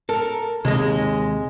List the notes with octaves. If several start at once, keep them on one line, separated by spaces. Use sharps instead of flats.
A4 A#4
D#2 C3 G#3 D#5